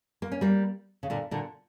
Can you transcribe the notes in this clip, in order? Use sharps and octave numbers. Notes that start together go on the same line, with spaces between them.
A#3
C#4
G3 A#3
C#3
A#2 D3
A#2 D3